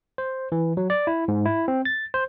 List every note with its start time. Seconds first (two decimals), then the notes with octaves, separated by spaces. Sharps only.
0.18 C5
0.52 E3
0.77 F#3
0.90 D5
1.07 E4
1.28 G#2
1.46 E4
1.68 C4
1.85 A6
2.14 C5